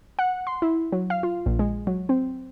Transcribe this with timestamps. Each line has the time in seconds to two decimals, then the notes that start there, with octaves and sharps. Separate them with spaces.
0.19 F#5
0.47 C6
0.62 E4
0.93 F#3
1.10 F5
1.23 F4
1.46 A#1
1.59 G#3
1.87 F#3
2.09 C4